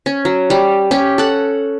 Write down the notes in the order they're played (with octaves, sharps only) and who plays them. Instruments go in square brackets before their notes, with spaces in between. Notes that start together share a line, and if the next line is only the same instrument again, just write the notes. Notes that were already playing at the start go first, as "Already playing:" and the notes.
[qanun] C#4
F#3
G3
C#4 G4
A4 F#5